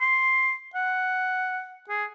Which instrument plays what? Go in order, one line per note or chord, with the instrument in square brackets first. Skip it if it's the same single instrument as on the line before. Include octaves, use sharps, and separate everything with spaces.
[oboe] C6
F#5
G#4